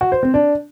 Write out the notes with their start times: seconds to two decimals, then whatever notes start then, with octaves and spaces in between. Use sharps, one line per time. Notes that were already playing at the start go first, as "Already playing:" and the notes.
0.01 F#4
0.12 C5
0.23 C4
0.34 D4